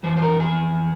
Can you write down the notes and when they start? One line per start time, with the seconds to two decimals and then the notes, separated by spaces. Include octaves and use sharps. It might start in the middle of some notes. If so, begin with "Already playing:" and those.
0.03 F2 E3 C5
0.17 C5
0.22 A#4
0.40 G#4